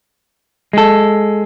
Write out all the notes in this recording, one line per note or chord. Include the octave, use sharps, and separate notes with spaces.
G#3 A4